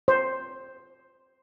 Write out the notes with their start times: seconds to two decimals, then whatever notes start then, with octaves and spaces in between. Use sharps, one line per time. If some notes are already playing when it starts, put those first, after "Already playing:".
0.08 C5